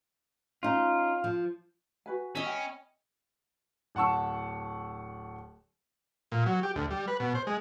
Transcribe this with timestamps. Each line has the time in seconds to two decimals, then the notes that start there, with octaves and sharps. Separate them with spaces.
0.63 C#4 D#4 F4
1.24 F3
2.06 F#4 B4 G#5
2.35 C#4 D#5 E5 B5
2.46 G5
3.95 D1 F#5 A5 C#6 E6
6.32 A#2
6.46 F#3
6.63 G4
6.75 D2
6.91 G3
7.08 B4
7.20 B2
7.35 C5
7.47 G#3